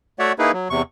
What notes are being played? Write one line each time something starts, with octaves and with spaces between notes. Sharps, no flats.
A3 F#4 C#5 D5 E5 F#5
A#3 D#4 E4 G#4 B4
F#3
E2 C3 C#6